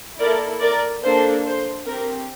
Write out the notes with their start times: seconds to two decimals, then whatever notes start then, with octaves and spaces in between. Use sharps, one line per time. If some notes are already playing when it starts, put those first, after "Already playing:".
0.19 A#3 E4 A4 A#4 D5
0.61 A#4 D5
1.04 A#3 D4 A4 C5
1.45 C5
1.87 C4 G4 A#4